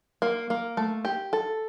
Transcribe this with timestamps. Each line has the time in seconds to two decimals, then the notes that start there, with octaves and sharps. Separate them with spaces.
0.22 A#3
0.50 A#3
0.77 A3
1.05 G4
1.33 A4